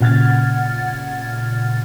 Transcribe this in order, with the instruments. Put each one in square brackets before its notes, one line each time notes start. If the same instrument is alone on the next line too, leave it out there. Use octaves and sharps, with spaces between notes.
[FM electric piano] A#2 C#3 F#5 F6 G#6 A6